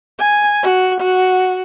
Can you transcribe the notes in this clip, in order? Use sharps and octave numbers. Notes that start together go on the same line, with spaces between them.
G#5
F#4
F#4